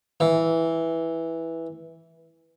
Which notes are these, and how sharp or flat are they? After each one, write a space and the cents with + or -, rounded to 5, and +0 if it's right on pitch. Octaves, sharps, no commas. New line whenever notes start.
E3 -5